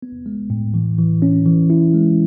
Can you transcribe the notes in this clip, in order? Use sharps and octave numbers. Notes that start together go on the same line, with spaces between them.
B3
G#3
A2
E3
E3
C#4
E3
E4
G#3